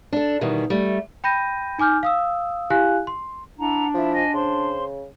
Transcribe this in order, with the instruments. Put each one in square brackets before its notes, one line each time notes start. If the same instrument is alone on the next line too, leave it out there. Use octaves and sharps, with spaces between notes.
[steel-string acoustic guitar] D4 A4
B2 D#3 E3 G3
G3 A3
[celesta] G5 B5 G6 A#6 D#7
D#4 G#5 D6 F6 G6
F5 D#6 E6
E4 G4 F5 G#5 F#6
C6
[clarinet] D4 [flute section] E4 F#5 A#5
[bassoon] F3 [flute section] E4 E5
[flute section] D#5 G#5
[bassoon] C#3 [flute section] C5 C6